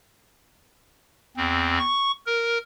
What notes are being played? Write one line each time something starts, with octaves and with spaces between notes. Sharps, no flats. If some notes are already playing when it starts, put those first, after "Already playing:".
E2 C4
C#6
A#4